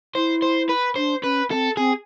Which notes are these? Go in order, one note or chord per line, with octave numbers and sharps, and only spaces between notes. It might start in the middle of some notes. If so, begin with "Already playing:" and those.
E4 C5
C5
B4
D4 C5
C#4 B4
C4 A4
C4 G#4